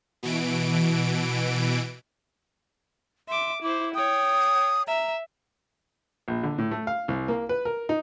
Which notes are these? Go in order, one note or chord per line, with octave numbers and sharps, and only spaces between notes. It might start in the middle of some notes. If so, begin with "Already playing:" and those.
B2 E3 D7
E5 C6 D6
E4 C5 D6
C#5 G5 D#6
E5 A#5
A#1
D3
A2
A3
F5
C2
A#3
B4
A#4
D#4